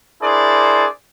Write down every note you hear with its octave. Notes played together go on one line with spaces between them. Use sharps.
D4 E4 G#4 A#4 C5 D5